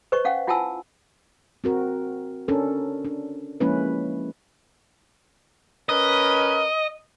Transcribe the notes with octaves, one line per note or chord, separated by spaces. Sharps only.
B4 C5 D#5 C#6
C#4 F5 F#5
E4 F4 F#5 G#5 A5 E6
C4 F#4 A#4
C#4 D4 A4 A#4
D4
F3 G#3 A#3 C#4 E4 B4
C#4 A#4 B4 D#5